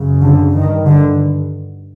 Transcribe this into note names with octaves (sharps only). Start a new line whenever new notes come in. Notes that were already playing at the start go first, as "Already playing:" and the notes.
Already playing: F#2 C#3
D3
G2 D#3
D3